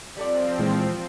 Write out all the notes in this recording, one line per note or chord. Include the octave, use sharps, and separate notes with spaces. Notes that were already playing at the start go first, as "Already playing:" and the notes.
F3 G3 C4 A4 D5
A#2 E3 G#3